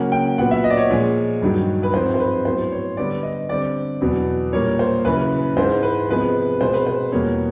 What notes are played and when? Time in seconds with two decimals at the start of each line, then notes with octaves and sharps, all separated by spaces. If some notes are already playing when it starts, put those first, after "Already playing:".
Already playing: C#3 F#3 A#3 C#4 F#5
0.12 G5
0.38 A#2 F#3 B3 F#5
0.51 E5
0.64 D#5
0.70 D5
0.77 C#5
0.90 A#2 F3 G#3
1.42 G2 D#3 F#3
1.83 B4
1.94 G#2 F3 G#3 C4 C5
2.14 C5
2.20 B4
2.45 A2 F#3 B3 C5
2.72 C#5
2.97 D3 G3 B3 D5
3.23 D#5
3.49 D3 G3 C4 D5
4.01 E2 B2 F#3 B3
4.53 A#2 G3 A#3 C#5
4.79 C5
5.05 F#2 C#3 E3 B4
5.57 G#2 E3 G#3 C5
5.83 B4
6.08 C3 F3 G#3 B3 B4
6.60 B2 G#3 C4 C5
6.74 B4
6.87 C5
7.12 E2 B2 G3 A#3 C#5